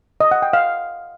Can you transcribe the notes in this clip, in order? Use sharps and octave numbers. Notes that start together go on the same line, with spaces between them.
D#5
F#5
G5
F5